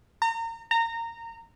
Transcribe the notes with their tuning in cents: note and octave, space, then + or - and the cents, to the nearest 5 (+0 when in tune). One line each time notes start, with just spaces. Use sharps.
A#5 -35
A#5 -25